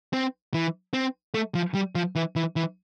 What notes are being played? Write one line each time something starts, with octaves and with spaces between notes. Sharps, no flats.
C4
E3
C4
A3
F3
G3
F3
E3
E3
E3